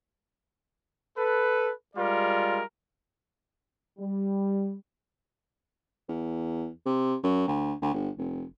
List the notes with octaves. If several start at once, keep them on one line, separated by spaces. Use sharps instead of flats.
A4 B4
G3 G#3 F4 A#4 D5
G3
E2
C3
F#2
D2
D2
G1
F1